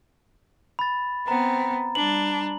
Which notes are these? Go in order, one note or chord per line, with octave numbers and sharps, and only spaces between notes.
B5 A6
B3 C4 A#5
G3 D4 F#7